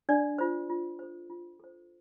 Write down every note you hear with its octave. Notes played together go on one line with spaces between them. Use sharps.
D4 D5
F4 C5
F4
A4 C5
F4
A4 C5